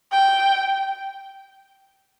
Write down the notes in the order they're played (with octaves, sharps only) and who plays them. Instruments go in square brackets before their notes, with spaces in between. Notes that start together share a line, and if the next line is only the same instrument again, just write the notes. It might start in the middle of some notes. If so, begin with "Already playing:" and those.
[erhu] G5